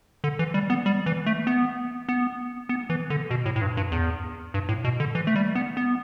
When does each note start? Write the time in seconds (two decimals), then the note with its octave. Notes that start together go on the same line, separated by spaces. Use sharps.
0.24 D3
0.39 E3
0.54 G3
0.70 B3
0.86 G3
1.06 E3
1.26 A3
1.47 B3
2.09 B3
2.69 B3
2.90 E3
3.10 D3
3.31 B2
3.46 A2
3.56 A2
3.62 G2
3.77 G2
3.92 E2
4.54 G2
4.69 A2
4.84 B2
5.00 D3
5.15 E3
5.27 A3
5.36 G3
5.55 B3
5.77 B3